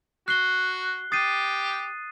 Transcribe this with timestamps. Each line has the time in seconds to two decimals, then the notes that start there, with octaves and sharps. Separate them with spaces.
0.28 F#4 F#6 C7 G7
1.12 G4 D#6 A6 C7 D#7